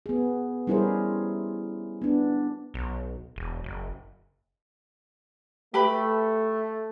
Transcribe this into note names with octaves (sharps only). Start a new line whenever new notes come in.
B3 G#4
G3 C#4 E4 G#4 A#4 C5
B3 D4
B1
E1
F#1
A3 G4 B4 B5